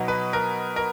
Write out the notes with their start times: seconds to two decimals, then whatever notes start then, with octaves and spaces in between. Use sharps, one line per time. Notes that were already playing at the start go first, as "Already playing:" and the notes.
Already playing: B2 F#3 B3 D#4
0.08 B4
0.33 A#4
0.76 A#4